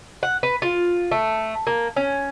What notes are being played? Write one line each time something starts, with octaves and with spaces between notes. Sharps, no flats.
F#5
B4
F4
A3
A#3
C#4